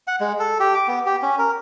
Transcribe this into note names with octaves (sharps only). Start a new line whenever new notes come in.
F#5
G#3
A4
G4
D6
B3
G4
C#4
A#4